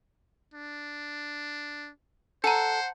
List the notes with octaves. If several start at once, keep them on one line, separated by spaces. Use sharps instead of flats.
D4
A4 C5 F#5 G#5 A#5